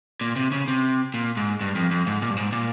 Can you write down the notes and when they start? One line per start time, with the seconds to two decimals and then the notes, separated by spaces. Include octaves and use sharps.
0.21 A#2
0.36 C3
0.52 C#3
0.68 C3
1.14 A#2
1.37 G#2
1.60 G2
1.75 F2
1.91 F2
2.06 G#2
2.22 A#2
2.30 G2
2.37 G#2
2.52 A#2